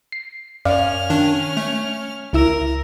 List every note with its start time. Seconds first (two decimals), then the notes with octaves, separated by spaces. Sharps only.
0.12 C7
0.65 F#2 C#4 D5 F5 F6
1.10 D#3 D4
1.57 A3
2.33 C#2 E4 A#4 E6